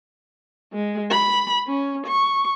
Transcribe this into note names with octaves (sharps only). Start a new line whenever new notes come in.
G#3
B5
C#4
C#6